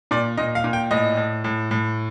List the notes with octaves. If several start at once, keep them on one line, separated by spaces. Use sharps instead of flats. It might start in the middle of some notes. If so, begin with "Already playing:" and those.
A#2 D5
A#2 D#5
F5
A#2
G5
A2 D#5
A2
A2
A2